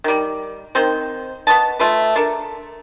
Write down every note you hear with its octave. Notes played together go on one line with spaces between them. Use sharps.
D#3 G3
D#3 C4 C5
B3 C#5 D#5 A5
A3 F4 B4
D4 A4 A#4